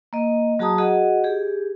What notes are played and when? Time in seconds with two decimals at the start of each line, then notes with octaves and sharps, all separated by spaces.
0.13 A#3 D#5
0.59 F#3 F#4 G#4 A5 A#5 D#6
0.78 F#4 G#4 D#5 F#5
1.24 G4 G#4